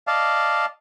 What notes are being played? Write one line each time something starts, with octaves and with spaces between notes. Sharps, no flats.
D5 D#5 F5 A5